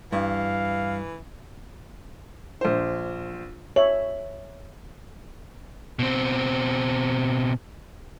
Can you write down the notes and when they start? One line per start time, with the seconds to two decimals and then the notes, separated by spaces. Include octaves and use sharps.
0.12 G2 E3 F5
2.61 A#1 C5
3.76 C#5 E5 F#7
5.99 B2 C4